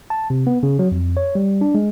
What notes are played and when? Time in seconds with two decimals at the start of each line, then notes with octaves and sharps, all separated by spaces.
0.10 A5
0.30 C3
0.47 B3
0.63 C#3
0.79 F#3
0.92 F2
1.17 C#5
1.35 G3
1.61 D4
1.75 G#3